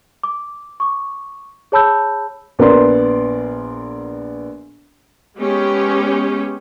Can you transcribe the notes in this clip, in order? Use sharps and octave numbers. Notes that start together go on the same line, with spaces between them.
D6
C#6 D6
G#4 C#5 A5 B5 E6 G6
A#1 B3 A#4 D5 C6
G#3 B3 C#4 G4